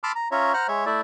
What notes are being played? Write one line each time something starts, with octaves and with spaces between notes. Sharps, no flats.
A5 B5 C6 D6 E6 F6
A#5
C#4 F4 C#5 E5 A#5
C5 F#5 A#5 F6 F#6
G#3 C#5 E5
A3 E4 D5 E5